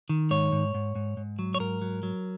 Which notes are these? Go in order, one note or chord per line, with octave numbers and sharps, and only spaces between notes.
D#3
G#2 C#5
G#2
G#2
G#2
G#2
F#3
C#5
G#2 A#4
F#3
F#3